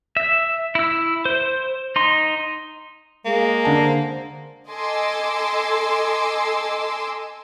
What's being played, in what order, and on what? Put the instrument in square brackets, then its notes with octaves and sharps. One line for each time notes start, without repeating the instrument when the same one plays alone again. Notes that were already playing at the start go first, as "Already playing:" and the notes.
[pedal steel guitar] E5
E4 E6
C5
D#4 C6
[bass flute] G#3 [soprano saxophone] A#3
[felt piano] D3 A5
[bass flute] C5
[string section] A4 D#5 G#5 C6 D6 E6